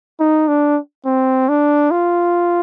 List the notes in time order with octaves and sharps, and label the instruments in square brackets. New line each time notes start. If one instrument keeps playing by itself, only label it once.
[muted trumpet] D#4
D4
C4
D4
F4